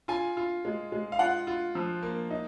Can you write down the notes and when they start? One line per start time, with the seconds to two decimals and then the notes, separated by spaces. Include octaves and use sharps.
0.08 F4 G#5
0.37 F4
0.65 G#3
0.92 G#3
1.12 F5
1.19 F4 F#5
1.47 F4
1.75 F3
2.02 A#3
2.31 D#4